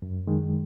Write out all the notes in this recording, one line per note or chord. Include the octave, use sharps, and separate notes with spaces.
F#2
D#3 G#3